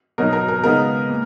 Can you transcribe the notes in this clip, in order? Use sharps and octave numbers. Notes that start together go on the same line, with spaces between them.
B2 F#3 B3 D#4 A#4
A#4
A#4
C#3 G#3 B3 D#4 A#4
A#2